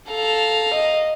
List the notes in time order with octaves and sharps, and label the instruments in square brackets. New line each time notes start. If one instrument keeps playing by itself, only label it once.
[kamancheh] A4 [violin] F5 A#5
[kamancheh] D#5